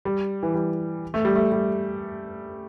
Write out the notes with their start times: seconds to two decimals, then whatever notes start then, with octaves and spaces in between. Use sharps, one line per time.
0.05 G3
0.43 E3
0.54 G3
1.14 A3
1.25 G3
1.36 A3
1.52 G3